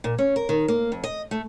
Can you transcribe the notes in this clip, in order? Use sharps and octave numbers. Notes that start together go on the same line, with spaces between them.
A#2
C#4
A#4
D#3
A#3
F2
D#5
A3